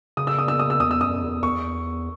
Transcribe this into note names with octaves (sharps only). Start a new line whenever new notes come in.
C#3 D#6
E6
D#6
E6
D#6
E6
E2 D#6
E6
F#2 D#6
E2
E2 C#6